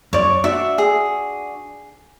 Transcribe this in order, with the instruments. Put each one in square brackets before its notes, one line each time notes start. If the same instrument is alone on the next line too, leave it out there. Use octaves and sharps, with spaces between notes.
[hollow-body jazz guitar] F#2 D5 [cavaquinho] C#5
[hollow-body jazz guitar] D4 F#4 [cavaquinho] E5
[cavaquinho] G#4